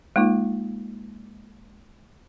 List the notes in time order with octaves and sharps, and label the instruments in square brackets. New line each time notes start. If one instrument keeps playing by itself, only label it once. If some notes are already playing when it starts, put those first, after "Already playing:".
[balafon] G#3 A#3 D#4 F4